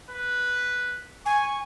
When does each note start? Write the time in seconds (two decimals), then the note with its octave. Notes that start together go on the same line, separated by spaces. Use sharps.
0.11 B4
1.26 G#5 C#6